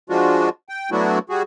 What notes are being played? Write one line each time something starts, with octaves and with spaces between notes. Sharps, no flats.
F3 G#3 D4 F4 F#4
G5
F#3 A3 B3 D4 E4 F#4
G3 F#4 G#4